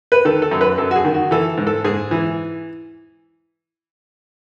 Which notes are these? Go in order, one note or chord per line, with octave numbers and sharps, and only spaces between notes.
B4
D#3 A4
A4
F#2
B4
F#2 A4
F#4
G#4
D#3
F#4
E3 A4
G#2
A4
G#2 G#4
E3